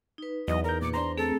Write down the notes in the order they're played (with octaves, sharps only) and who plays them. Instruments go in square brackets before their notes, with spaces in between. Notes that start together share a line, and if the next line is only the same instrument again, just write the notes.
[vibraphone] D#4 B4
[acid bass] E2 [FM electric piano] F#3 [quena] D#5
[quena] A#4 [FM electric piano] A#5 G6
[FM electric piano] A#2 C#7 [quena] D6
[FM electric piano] D4 C5 A#5 [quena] C6
[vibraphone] A3 C4 G#4 [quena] A4